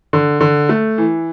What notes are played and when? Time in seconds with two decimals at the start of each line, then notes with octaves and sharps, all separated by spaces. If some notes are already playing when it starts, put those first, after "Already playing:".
0.13 D3
0.41 D3
0.69 A3
0.98 E3